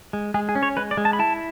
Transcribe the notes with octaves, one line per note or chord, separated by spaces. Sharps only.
G#3
G#3 G#4
G#4
C#4
C#5
G#3 B4
D5
G#3
A5
B5
E4 A5